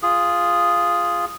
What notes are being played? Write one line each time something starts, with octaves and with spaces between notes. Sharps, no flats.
F4 G#4